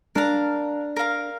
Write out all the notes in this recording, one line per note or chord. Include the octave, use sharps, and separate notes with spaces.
D4 A#4 F5 A#5
A#4 F5 A#5